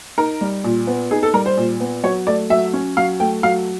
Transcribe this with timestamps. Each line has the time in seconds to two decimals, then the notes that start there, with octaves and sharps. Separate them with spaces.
0.18 D#4 A#4
0.41 G3
0.64 A#2
0.87 B3
1.11 D#4 G#4
1.23 A4
1.34 G3 A#4
1.46 C5
1.57 A#2
1.80 B3
2.03 F#3 C#5
2.27 A3 D5
2.50 F#3 E5
2.73 C#4
2.97 F#3 F5
3.20 A3 G5
3.43 F#3 F5